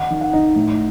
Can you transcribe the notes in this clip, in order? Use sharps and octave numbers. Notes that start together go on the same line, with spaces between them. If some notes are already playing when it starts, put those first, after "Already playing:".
Already playing: D#3 D#4 F#5
D#3
F#5
D#4
A2